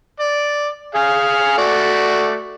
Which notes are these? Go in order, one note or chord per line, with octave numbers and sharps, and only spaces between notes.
D5
G#4 F5 G#5
A3 F#4 D5